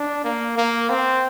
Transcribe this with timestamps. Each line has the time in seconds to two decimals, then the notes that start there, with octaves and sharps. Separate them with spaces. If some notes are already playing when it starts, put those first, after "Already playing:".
Already playing: D4
0.24 A#3
0.58 A#3
0.90 C4